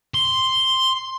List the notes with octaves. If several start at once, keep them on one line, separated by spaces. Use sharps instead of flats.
C6